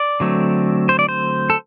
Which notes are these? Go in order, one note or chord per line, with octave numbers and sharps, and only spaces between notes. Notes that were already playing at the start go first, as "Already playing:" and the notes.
Already playing: D5
D3 F#3 A3 C4
C5
D5
C5
A4